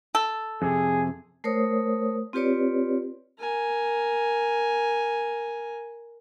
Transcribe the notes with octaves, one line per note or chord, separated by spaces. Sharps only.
A4
F2 C3 G#4
A3 A#4 C5 C#5 D#6
C4 F4 G4 B4 C#5 D5
A#4 G#5